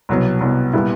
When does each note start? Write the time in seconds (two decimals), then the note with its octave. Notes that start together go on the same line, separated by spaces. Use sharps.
0.09 C2 B2 F#3 B3
0.41 C2 B2 F#3 B3
0.73 A#2 G3 B3 E4